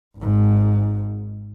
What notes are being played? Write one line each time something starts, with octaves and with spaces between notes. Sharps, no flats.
G#1 G#2